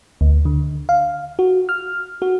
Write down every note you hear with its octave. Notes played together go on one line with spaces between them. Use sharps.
D2
D3
F5
F#4
F6
F#4